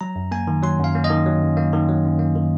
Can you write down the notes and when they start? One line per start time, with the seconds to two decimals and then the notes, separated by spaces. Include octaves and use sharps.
0.01 F#3 A#5
0.16 F#2
0.31 A#3 G#5
0.47 D#3
0.63 F#3 C6
0.79 F#2 F5
0.95 A#3
1.04 D#5
1.10 D#3
1.26 F#3
1.42 F#2
1.57 A#3
1.73 D#3
1.88 F#3
2.05 F#2
2.19 A#3
2.35 D#3